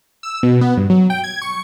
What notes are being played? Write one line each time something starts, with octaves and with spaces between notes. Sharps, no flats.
E6
B2
B3
G2
F#3
G5
G#6
C#6